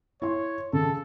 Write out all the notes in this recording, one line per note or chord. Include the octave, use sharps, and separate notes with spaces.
E4 C#5 C6
C#3 A4